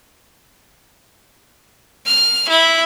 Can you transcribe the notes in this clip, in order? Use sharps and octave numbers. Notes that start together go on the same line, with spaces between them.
F6
E4